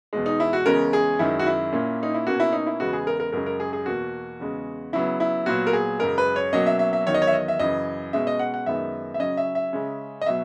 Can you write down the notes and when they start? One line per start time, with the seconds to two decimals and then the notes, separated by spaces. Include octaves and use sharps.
0.13 E2 B2 G#3
0.26 D#4
0.40 E4
0.53 F#4
0.66 E2 C#3 G#3 C#4 A#4
0.93 G#4
1.19 F#2 D#3 G#3 C#4 E4
1.39 F#4
1.46 E4
1.72 A#2 A#3 C#4
2.03 D#4
2.14 E4
2.26 B2 A#3 C#4 F#4
2.40 E4
2.53 D#4
2.66 E4
2.80 E2 C#3 G#3 B3 F#4
2.93 G#4
3.07 A#4
3.20 A#4
3.32 F#2 C#3 G#3 C#4 A#4
3.46 A#4
3.60 G#4
3.73 G#4
3.86 E2 B2 A#3 F#4
4.40 E2 C#3 G#3
4.93 C#3 F#3 B3 E4
5.20 E4
5.46 A#2 F#3 B3 F#4
5.67 A#4
5.73 G#4
5.99 F#2 C#3 G#3 A#4
6.18 B4
6.36 C#5
6.53 B2 F#3 A#3 C#4 D#5
6.66 E5
6.79 E5
6.93 E5
7.07 E2 D#3 F#3 C#5
7.14 D#5
7.22 C#5
7.27 E5
7.33 D#5
7.48 E5
7.59 F#2 C#3 E3 D#5
8.13 B2 G#3 C#4 E5
8.27 D#5
8.39 F#5
8.54 F#5
8.66 F#2 D#3 G#3 B3 E5
9.14 E5
9.20 C#3 F#3 C#4 D#5
9.37 E5
9.55 E5
9.73 C#3 G#3 C#4
10.21 D#5
10.26 B2 F#3 E5